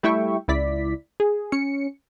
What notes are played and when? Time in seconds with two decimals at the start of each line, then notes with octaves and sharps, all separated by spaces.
0.03 G3 A3 E4 E5 G5 C#6
0.48 C#2 E4 D5 B6
1.20 G#4
1.52 C#4 C#7